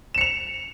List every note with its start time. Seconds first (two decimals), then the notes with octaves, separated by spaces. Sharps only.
0.14 E7
0.18 C#7
0.21 F7